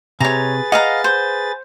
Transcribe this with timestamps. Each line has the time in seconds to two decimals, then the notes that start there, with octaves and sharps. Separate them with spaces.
0.20 C3 G#4 B4 C#5 A#5 A6
0.72 D#5 F5 F#5 A#5
1.04 C5